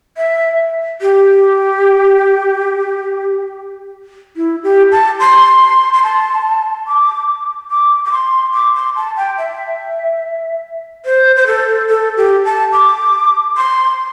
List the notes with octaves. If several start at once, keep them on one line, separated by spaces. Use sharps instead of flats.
E5
G4
E4
G4
A5
C6
C6
C6
A5
D6
D6
D6
C6
D6
C6
A5
G5
E5
C5
C5
A4
A4
G4
A5
D6
C6